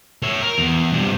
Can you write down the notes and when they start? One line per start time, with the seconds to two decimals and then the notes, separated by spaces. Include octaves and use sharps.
0.23 C#5 E5
0.42 A#4
0.58 E2
0.93 G2 C3